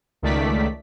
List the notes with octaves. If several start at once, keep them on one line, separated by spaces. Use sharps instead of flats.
C#2 D#3 A3 D5 B6